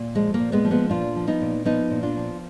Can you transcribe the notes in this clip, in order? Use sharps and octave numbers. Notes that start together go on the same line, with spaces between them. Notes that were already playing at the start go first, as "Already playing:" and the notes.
Already playing: A#2
F3 G#3
A#3
A#2
G#3 B3
F3
G#3 B3
A#2 D4 F4
F3
B3 D#4
A#2
F3 B3 D#4
A#2
D4 F4
F3